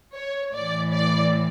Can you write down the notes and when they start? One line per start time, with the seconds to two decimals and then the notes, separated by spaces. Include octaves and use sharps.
0.15 C#5
0.54 A2 E3 D5
0.91 D5